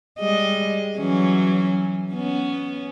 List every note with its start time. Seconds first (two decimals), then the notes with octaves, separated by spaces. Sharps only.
0.19 G3 G#3 D#5
0.97 E3 F#3 C#4
2.13 B3 C#4